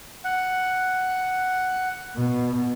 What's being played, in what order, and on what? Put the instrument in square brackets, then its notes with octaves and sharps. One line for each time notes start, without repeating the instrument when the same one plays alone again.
[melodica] F#5
[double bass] B2